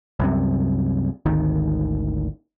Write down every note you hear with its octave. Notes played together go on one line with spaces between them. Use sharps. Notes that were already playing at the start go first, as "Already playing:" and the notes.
C2 F#2 C3
G#1 D2 D#3